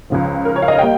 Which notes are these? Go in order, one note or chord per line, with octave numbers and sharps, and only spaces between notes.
C#2 C#3 F3
A#4
C#5
F5
D#5
G3 A#3 G5